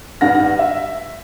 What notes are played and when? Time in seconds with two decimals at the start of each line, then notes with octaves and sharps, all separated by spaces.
0.21 G2 D#3 F#5 F6 A#6
0.59 E5